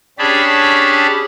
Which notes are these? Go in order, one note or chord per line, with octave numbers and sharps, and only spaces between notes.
C#4 D4 G4 G#4 A5 B5